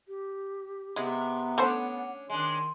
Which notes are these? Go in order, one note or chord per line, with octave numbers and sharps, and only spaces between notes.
G4
C3 G#3 B3
A3 C#4 D4 A4 C5 F#5
D#3 G#3 D4 C6